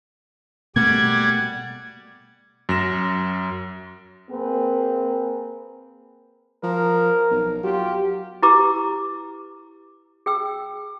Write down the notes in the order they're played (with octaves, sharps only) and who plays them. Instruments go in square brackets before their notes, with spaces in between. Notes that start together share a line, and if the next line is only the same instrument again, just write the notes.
[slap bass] B2 A3 A#3 [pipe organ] G3 D5 F#5 [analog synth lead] G#6
[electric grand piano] F#2 A#6 E7
[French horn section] A#3 C4 G#4 A#4 B4
[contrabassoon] F3 [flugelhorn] A#4
[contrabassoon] B1
[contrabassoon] F#3 [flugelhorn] F4 [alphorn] G4
[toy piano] E4 G4 B4 A#5 D6 E6
G#4 G5 E6